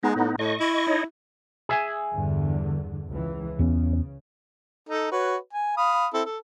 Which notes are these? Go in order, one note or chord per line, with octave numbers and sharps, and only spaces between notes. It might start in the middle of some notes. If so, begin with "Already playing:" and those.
G#3 B3 D#4
A2
A2 D#5 C#6
E4
D#4 C#5 D#5
G#4 E5 G#5
E2 G2 D3
C#2 E3
E2 C#3 B3 C#4
D#4 A4
F#4 B4 C#5
G#5
F5 B5 D#6
C4 E4 A4
A4